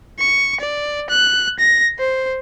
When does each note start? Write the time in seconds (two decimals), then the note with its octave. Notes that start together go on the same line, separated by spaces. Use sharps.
0.19 C#6
0.60 D5
1.10 F#6
1.59 A#6
1.99 C5